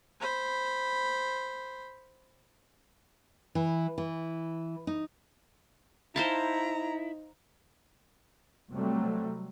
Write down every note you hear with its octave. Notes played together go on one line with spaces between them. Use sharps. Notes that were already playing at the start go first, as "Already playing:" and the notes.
C5 B5
E3
E3
D#4
D#4 E4 C5 F5 A5 A#5
C3 F#3 G3 A3